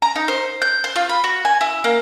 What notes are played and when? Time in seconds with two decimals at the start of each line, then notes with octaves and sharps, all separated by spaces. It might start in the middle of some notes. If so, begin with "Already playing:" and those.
0.02 A#5
0.16 D#4
0.28 C5
0.62 G6
0.84 C5
0.96 F4
1.09 B5
1.24 F#4
1.45 G#5
1.61 E4
1.84 A#3